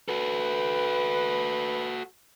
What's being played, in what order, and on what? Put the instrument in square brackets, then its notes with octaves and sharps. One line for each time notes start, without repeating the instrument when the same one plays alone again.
[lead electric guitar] F#4 A4 [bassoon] B4